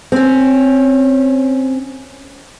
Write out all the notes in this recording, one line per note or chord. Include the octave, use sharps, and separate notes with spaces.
C4 C#4